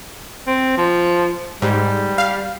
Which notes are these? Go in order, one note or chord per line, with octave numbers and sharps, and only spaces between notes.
C4
F3
G#2 G3
F5